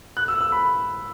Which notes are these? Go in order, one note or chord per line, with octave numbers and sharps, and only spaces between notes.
F#6
E6
E6
B5